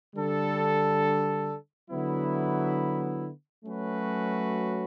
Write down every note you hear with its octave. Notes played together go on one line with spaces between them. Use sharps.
D3 G3 D4 A4
D3 F#3 B3 E4
F#3 A3 C#4 F#4 B4